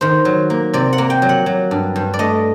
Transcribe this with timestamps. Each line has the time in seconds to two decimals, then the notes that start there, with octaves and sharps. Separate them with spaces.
0.01 D#3 C5
0.25 F#3
0.50 A#3
0.74 C3 D5
0.93 F#5
0.98 A#3
1.10 G5
1.22 F#3
1.29 F#5
1.46 F#3
1.71 G2
1.96 G2
2.14 D5
2.19 A3 D#5